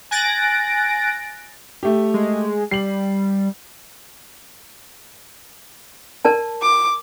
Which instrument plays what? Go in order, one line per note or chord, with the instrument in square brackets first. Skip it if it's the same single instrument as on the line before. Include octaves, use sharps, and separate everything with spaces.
[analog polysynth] G#5 F#6 A6 A#6 D7
[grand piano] A3 G4
[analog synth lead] G#3
[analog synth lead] G3 [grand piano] C7 F#7
[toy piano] A#4 D5 A5
[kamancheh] D6